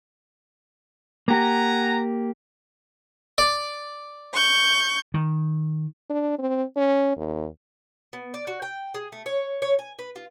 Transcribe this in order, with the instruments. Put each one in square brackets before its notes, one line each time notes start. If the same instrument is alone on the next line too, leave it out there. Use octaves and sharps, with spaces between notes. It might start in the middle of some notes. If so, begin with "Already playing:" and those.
[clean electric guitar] A#3 G4 [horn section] F#5 G#5 A#5
[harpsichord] D5
[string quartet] C#6 G6
[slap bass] D#3
[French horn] D4
C4
C#4
D#2
[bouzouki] B3
D5
F#4
G5
G#4
A3
C#5
C#5
G#5
B4
F4